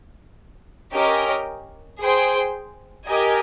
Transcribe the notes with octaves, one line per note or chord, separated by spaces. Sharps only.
C#4 G4 A#4 D#5
G#4 C5 G5
G4 A#4 D#5 G#5